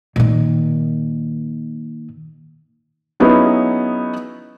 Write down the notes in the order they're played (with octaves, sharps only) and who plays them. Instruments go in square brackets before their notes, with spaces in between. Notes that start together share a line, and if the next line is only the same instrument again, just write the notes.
[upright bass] A#2 D#3
[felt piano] F#3 B3 C#4 D#4 E4 G#4